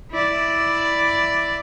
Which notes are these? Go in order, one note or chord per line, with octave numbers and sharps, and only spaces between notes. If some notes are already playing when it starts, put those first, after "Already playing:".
E4 D5